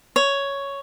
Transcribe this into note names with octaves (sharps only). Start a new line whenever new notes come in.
C#5